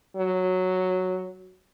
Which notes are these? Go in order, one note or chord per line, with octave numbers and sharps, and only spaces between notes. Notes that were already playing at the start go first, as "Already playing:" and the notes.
F#3